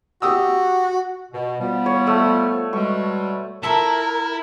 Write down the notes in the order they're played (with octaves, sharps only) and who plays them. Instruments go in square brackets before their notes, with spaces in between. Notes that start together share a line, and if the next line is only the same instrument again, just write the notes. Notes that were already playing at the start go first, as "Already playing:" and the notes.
[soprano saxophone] F#4 [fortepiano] G4 D#6 E6
[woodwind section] B2
F3 G3 B3
[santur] C#5
A3
[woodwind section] B2 G3 G#3 [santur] C#6
[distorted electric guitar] E4 [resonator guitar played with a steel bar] F4 A4 A5 [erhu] A#4